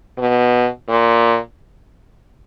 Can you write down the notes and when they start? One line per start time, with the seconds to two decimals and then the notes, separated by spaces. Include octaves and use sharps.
0.18 B2
0.89 A#2